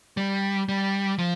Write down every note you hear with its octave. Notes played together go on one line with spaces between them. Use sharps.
G3
G3
F3